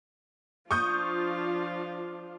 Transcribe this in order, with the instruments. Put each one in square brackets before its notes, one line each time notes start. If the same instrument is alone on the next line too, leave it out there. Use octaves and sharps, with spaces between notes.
[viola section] F3 D4 F4 [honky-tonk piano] C#6 D#6 G6